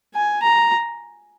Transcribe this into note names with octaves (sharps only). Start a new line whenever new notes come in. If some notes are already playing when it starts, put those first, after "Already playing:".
G#5
A#5